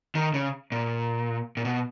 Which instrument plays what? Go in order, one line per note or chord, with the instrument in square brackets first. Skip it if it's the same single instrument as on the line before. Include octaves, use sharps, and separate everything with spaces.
[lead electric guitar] D#3
C#3
A#2
A#2
B2